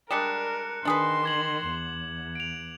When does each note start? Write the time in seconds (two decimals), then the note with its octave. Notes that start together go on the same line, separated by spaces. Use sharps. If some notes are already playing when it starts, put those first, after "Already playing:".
0.11 G3 G#3 D4 A#4 F#6 C#7 E7
0.85 D#3 D4 G#4 B4 C6
1.24 D6 G#6 F#7
1.68 E2
2.35 D7 F7